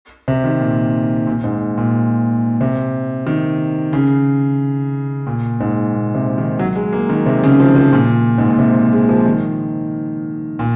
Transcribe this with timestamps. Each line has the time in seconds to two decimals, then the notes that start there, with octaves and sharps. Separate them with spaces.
0.28 C3
0.44 D#3
0.60 A#2
1.27 A#2
1.44 G#2
1.78 A#2
2.61 C3
3.27 D#3
3.93 C#3
5.27 A#2
5.60 G#2
5.93 A#2
6.15 C3
6.38 D#3
6.59 F#3
6.76 G#3
6.93 A#3
7.10 D#3
7.26 C3
7.43 C#3
7.60 F3
7.76 F3
7.93 A#2
8.38 G#2
8.49 A#2
8.59 C3
8.93 G#3
9.09 F3
9.26 D#3
10.59 A#2